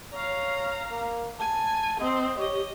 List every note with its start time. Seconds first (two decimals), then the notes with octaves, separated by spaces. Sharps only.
0.14 C#5 F5 A#5
0.91 A#3
1.40 G#5 A5
2.00 C4 D#5
2.38 G4 C#5 D#5